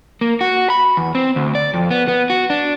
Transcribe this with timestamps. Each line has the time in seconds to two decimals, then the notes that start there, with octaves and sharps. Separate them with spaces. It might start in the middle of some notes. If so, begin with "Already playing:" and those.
0.21 A#3
0.41 F#4
0.70 B5
0.97 E2
1.15 C4
1.36 D2
1.55 D5
1.74 F2
1.91 B3
2.08 B3
2.30 F#4
2.50 D4